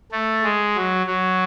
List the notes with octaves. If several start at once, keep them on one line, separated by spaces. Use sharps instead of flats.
A3
G#3
F#3
F#3